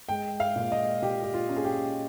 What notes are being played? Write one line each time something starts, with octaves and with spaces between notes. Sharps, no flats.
G#3 G5
F5
A#2
D#5
A#2 G4
G4
F4
C#4
G#4
G4